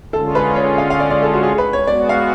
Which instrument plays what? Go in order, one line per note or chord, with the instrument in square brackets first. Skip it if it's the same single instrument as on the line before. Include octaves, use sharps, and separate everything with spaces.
[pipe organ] D3 G#3 C#4 F4 [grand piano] A4
[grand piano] B4
C#5
F5
F5
D5
D5
A4
F#4
G#4
B4
C#5
[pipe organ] G#3 B3 F#4 [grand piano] D5
[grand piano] F5